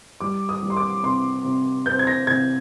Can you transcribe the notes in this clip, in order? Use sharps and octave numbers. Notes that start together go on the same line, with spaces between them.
G3 D6
D#6
G3
C6
D6
C3 C6
C3
C4 G6
G#6
A#6
C3 G#6